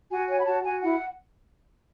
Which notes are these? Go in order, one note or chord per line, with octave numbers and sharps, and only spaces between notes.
F#4 G#5
C#5 G#5
B5
F#4 A5
F#4 G#5
E4 F#5